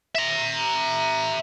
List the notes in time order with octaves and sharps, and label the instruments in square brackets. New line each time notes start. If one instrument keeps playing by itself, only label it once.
[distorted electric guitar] E5 A#5